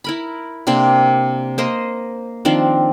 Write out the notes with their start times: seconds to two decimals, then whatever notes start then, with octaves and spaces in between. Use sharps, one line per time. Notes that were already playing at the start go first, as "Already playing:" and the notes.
0.04 E4 A#4 B5
0.67 C3 A#3 C4 D4
1.58 A#3 C5 D#5
2.45 D#3 F3 C4 D4